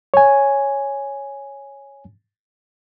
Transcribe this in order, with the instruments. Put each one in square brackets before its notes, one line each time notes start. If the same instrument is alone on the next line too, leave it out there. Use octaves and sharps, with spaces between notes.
[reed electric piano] C#5 G#5